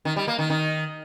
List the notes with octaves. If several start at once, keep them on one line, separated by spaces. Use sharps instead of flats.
D#3
G3
A#3
D#3
D#3